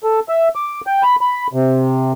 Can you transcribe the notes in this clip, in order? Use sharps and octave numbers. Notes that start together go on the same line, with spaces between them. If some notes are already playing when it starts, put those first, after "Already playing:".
A4
E5
D6
G5
B5
B5
C3